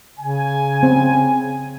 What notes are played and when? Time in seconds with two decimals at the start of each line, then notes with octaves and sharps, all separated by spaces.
0.19 C#3 G#5
0.83 C4